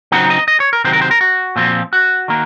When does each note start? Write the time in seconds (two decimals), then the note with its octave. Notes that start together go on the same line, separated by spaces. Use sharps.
0.12 C#3 F#3 C4 D#4 F#5
0.30 D#5
0.48 D#5
0.60 C#5
0.73 A#4
0.84 C3 D#3 F#3 C5
0.93 A#4
1.02 C5
1.11 A#4
1.21 F#4
1.56 A#2 F3 C4
1.93 F#4
2.28 D#3 A#3